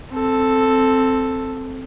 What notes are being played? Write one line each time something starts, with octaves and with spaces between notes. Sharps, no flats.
C4 A4